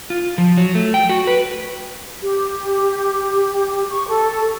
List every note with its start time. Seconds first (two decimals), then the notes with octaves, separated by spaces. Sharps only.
0.10 F4
0.38 F3
0.57 F#3
0.75 A3
0.94 G5
1.09 F#4
1.27 B4
2.23 G4
3.90 C#6
4.07 A4